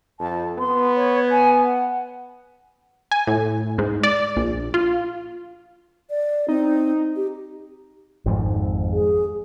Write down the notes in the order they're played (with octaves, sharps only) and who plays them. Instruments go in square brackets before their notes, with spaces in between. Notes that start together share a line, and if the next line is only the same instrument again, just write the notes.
[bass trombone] F2 [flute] A5
[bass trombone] B3 [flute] C6
[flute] C#5
G#5
F#5
[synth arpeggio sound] G#5
A2
G#2
D5
A#1
F4
[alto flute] D5
[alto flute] C4 [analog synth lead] D#4
[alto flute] G4
[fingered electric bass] G#1 F2 G#2
[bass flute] G#4